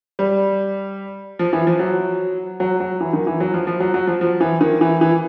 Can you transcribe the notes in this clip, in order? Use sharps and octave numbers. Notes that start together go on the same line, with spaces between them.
G3
F3
E3
F3
F#3
F#3
F#3
E3
D#3
E3
F#3
F3
F3
F#3
F#3
F3
F3
E3
D#3
E3
E3